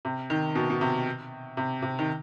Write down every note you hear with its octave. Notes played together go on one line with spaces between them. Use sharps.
C3
D#3
B2
B2
C3
C3
C3
D#3